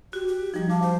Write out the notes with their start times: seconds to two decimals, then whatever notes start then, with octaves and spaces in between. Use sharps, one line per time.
0.13 F#4 G4
0.28 G4
0.54 F3 G3 D#4
0.70 F5 A5 D6
0.82 C5